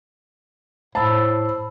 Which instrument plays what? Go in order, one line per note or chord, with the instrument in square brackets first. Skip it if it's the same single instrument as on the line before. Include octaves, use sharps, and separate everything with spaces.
[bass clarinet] A2 [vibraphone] C5 B5 E6 [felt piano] A5